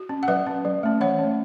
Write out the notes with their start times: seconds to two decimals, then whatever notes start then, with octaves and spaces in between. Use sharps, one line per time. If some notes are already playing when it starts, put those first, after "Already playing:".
Already playing: F#4
0.09 C#4
0.23 F#5
0.28 F#3 B4 E5
0.47 C#4
0.65 F#3
0.83 A3 C#4
1.00 E3 C#5 F#5
1.19 A3 C#4